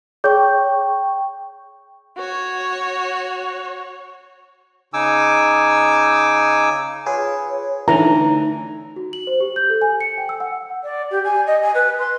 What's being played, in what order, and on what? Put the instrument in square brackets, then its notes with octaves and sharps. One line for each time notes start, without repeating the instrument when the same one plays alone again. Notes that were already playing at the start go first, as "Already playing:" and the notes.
[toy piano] G#4 C#5 [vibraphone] G5 C#6
[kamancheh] F#4 C#5
[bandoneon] C#3 D#4 G#5 D6 E6
[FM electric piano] F4 G#4 B4 [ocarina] C#5
[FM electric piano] D3 A3 C#4 [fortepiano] E3 [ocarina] D#4 [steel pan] A#5
[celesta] F#4
F#7
C5
G4
G6
A4
G#5
C#7
G5
E6
F#5
[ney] D5
G4
G#5
D#5
G#5
B4
C6